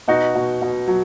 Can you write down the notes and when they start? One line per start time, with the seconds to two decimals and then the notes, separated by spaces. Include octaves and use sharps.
0.08 B2 D#4 F#4
0.35 B2
0.62 B2
0.87 F#3